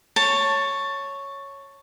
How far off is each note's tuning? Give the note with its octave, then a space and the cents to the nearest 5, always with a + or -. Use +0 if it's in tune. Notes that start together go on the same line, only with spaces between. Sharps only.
C#5 +0 A5 +15